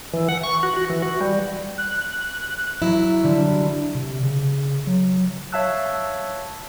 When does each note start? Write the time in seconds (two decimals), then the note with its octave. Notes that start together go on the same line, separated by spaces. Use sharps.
0.14 E3
0.29 F#5
0.43 C#6
0.63 F#4
0.76 F#4
0.90 E3
1.02 F#4
1.21 G3
1.78 F#6
2.82 F#3 E4
3.23 D3 G3
3.95 C3
4.23 C#3
4.87 F#3
5.52 C#5 E5 F5 A5 E6 F#6